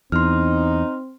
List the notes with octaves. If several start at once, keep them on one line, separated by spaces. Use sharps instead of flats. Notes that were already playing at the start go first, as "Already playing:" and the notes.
E2 C4 D#4 C6 F6